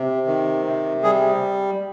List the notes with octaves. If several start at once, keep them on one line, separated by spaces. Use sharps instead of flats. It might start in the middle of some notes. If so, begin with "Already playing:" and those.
Already playing: C3
D#3
C3
G3 G#4